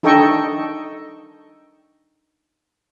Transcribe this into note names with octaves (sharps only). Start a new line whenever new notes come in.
D4 D#4 A4 D#5 G5 C#6